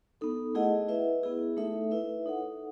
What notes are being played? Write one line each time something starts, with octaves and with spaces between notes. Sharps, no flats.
B3 D#4 A4
A3 E4 G#4 D#5 F#5
E4 B4 E5
B3 E4 G#4
A3 D#4 A4 E5
E4 B4 E5
D#4 A4 C#5 F#5